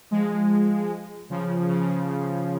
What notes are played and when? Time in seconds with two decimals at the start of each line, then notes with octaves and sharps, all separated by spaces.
0.11 F3 G#3
1.30 C#3 F3
1.69 C#3 F3